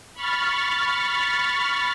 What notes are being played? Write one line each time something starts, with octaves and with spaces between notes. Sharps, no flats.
B5 C#6 F6 A6